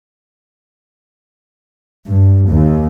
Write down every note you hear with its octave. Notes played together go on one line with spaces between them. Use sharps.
G2
D#2